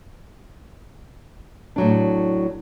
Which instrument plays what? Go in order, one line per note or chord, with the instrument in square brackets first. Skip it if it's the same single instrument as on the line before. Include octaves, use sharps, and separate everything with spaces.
[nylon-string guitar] A2 F#3 D4